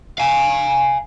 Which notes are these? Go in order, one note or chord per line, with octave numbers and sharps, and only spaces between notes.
F5 G#5